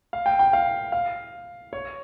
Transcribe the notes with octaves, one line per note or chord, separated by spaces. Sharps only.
F5
G5
G5
F5
F5
C#5